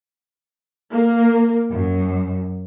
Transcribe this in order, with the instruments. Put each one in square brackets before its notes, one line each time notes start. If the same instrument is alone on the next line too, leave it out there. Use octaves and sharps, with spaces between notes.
[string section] A#3
F#2